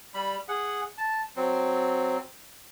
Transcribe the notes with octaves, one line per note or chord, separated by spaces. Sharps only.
G3 B5
G#4 F#5
A5
F#3 C4